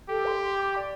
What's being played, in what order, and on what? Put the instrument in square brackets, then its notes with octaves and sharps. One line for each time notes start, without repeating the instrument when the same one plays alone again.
[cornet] G4 [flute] A4
[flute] C6
C6
D6
D5